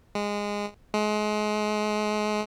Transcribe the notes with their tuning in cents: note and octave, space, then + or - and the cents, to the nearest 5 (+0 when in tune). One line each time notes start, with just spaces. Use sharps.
G#3 -15
G#3 +30